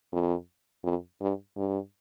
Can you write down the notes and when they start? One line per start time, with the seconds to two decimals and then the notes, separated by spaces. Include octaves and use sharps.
0.12 F2
0.84 F2
1.21 G2
1.56 G2